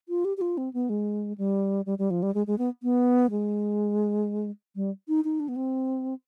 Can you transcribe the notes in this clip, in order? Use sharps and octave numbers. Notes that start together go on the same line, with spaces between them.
F4
G4
G4
F4
C4
B3
G#3
G3
G3
G3
F3
G3
G#3
G#3
B3
B3
G#3
G3
D#4
D#4
D4
B3
C4